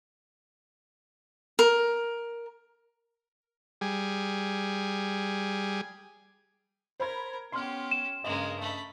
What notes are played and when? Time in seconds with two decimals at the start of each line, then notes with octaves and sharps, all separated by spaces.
1.59 A#4
3.81 G3 G#4
7.00 A#4 C5 B5 G#6
7.52 B3 C#4 G4 C6 F6
7.91 E7
8.24 G2 C#3 G#3 A#3 D#5
8.60 A3 B5